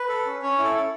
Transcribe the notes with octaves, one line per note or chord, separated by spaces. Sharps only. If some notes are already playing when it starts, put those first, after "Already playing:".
Already playing: B4
A4
C#4
C#4 C#5
E4 A4
A4